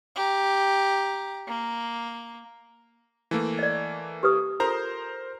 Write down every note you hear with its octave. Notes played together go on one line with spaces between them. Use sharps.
G4 A#5
A#3
E3 A3 A#3
D5 D#5
G4 B4 D#6
F4 A4 A#4 C5 A#5